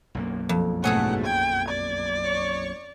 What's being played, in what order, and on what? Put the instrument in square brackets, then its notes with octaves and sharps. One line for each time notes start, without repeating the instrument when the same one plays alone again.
[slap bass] B1 F#2 A#3
[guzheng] F2
[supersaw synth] G#2 B2 A3 [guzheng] C#4 G#4 A4 [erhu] F#5
[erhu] G5 [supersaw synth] G#6
[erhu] D5
[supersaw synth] C#5 C#6